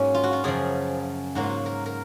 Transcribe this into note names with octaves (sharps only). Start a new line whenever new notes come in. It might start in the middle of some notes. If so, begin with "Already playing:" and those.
Already playing: G#2 F#3 A#3 C#4
F4
F#4
F4
F#2 C#3 F3 G#4
G#2 F#3 A#3 F#4
F4
F#4
A#4
A#4